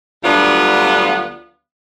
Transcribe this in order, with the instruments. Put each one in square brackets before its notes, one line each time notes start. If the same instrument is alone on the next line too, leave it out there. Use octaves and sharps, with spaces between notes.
[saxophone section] D2 F#3 G3 B3 D4 F4